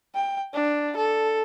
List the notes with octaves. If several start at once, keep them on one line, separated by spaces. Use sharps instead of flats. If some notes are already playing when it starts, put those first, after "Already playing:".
G5
D4
A4